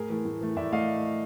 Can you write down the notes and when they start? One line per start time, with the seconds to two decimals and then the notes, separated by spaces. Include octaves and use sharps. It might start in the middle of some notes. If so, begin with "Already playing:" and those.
Already playing: A2 G#4 A#4
0.10 E3 A3
0.25 A2
0.41 E3 A3
0.56 A2 D5 E5
0.72 A3 D#5 F5